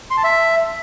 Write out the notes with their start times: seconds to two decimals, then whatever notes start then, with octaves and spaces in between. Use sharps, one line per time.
0.11 C6
0.17 A5
0.24 E5